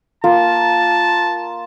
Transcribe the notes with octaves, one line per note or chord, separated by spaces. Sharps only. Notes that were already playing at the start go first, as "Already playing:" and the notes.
A#3 F4 A#4 A5